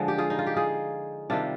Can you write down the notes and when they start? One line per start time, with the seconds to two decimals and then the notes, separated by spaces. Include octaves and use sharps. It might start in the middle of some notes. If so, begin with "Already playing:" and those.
Already playing: D3 F3 G#3
0.08 G4
0.18 F4 G#4
0.30 D#4
0.39 F4
0.47 G4
0.56 F4 G#4
1.30 C3 D#3 G3 D4 F4